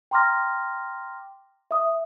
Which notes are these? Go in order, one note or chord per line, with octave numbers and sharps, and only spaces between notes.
G5 A#5 C6 D6 F6 A#6
E5 D#6